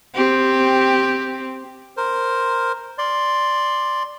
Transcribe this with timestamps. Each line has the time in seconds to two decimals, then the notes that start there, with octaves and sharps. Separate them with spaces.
0.15 C4 G4
1.97 A#4 C5
2.98 D5 C6